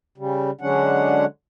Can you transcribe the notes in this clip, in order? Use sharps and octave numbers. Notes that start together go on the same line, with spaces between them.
C#3 G3
D3 F#3 G#3 C#4 D4 F#5